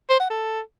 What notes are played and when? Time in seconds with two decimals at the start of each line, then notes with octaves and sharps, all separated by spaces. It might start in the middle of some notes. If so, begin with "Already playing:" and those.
0.10 C5
0.20 F#5
0.30 A4